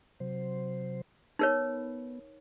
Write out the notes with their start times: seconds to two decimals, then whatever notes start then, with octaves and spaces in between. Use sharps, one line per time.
0.20 C3 F#3 C5
1.39 B3 D#4 A#4 C#5